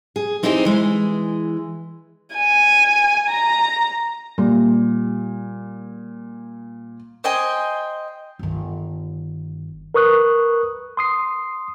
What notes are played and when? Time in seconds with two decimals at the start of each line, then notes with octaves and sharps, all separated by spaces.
0.16 G#4
0.43 C4 D#4 E4 G4 G#4 C5
0.65 E3 G#3
2.35 G#5
3.29 A#5
4.38 A#2 G3
7.24 C5 D#5 G5 G#5
8.39 G1 D#3
9.94 A#4 B4 C#6 D#6 F#6
10.97 C6 D#6 C7